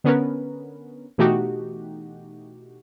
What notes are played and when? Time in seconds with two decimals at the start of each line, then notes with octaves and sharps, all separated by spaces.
0.04 D3 B3 C#4 A#4 B4
1.18 B2 E3 A3 D#4 F#4 G4